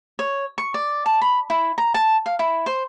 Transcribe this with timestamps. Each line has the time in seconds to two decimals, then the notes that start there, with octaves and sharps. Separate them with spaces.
0.19 C#5
0.58 C#6
0.74 D5
1.06 A5
1.21 B5
1.50 E4
1.78 A#5
1.94 A5
2.26 F5
2.39 E4
2.66 C5